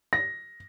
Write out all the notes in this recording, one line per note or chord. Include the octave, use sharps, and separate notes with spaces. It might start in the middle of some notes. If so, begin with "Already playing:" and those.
A#6